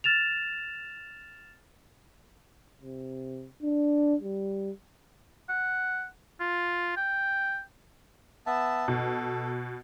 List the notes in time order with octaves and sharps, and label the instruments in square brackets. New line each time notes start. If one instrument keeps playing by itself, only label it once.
[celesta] F6 A6 E7 F7
[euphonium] C3
D4
G3
[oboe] F#5
F4
G5
[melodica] B3 E5 A5
[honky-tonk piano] B2 [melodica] A4